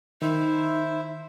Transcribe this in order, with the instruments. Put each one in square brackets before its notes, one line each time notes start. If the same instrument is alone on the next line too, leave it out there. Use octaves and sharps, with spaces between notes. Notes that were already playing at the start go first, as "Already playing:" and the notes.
[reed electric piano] D#3 [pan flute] D#4 [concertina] E4 C5 E5